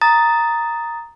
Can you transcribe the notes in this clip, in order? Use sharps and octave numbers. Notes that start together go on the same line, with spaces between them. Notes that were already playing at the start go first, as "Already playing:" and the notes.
A#5 D#6 A6